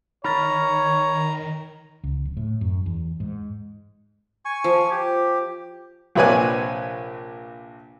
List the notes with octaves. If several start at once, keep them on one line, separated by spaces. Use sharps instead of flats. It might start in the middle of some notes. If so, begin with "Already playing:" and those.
D#3 C#5 A#5 B5 F6 A6
C#2
D1
A2
F#2
E2
G#2
G#5 C#6
F3
G4
A#1 C3 B4 C#5 D5 G#5